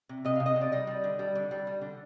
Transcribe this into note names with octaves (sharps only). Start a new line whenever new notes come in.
C3
C3 D#5
C3 F5
D#5
C3
D5
G3 D#5
G3
D3
G3
D3
G3
G3
D3